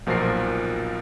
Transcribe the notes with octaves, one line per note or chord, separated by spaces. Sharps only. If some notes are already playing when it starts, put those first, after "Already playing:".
B1 A#2 F3 F#4 A#4 C7